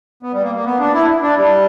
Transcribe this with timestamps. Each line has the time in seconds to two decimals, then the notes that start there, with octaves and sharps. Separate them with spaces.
0.23 B3
0.33 G3
0.43 A#3
0.55 A#3
0.65 B3
0.79 D4
0.93 E4
1.22 D4
1.36 G3